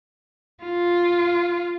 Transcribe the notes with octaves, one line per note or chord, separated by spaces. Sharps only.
F4